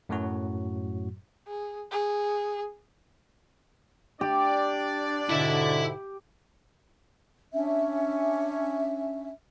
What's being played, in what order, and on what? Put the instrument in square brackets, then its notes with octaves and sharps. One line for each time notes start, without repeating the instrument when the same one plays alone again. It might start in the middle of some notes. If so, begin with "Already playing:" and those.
[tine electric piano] F#2 A2 F#3 F#4
[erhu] G#4
G#4
[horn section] D4 D5 [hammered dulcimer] G4
[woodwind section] G#2 B2 D3 [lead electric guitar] E4 E5
[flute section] C#4 D4 E5